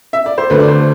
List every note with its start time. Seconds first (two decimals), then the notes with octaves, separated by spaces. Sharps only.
0.13 E5
0.26 D5
0.38 C5
0.50 D2 D3 A3 B4
0.60 D5
0.68 C5